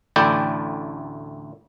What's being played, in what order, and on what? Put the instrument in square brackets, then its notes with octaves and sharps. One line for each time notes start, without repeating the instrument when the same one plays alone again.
[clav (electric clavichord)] A1 D2 A3 E4 D5 G5